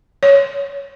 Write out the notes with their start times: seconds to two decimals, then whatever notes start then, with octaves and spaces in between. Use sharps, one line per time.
0.23 C#5